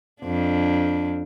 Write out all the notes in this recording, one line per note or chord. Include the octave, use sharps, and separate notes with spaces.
F2 D4